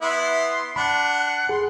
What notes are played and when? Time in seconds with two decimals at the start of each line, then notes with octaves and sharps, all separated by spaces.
0.02 B3 E4 C6
0.76 D4 F#5 B5
1.49 G#4 C6